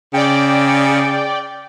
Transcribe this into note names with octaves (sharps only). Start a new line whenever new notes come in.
C#3 D5 G5